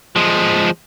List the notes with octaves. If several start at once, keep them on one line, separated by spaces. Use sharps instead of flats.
F3 G#3